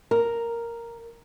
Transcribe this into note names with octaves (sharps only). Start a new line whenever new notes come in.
A#4